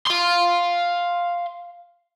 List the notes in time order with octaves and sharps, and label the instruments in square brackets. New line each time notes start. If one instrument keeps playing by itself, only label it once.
[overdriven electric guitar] F5 C6